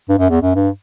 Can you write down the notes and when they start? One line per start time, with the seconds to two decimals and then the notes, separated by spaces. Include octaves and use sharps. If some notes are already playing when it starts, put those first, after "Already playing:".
0.09 G2
0.18 F#2
0.30 E2
0.42 F#2
0.55 G2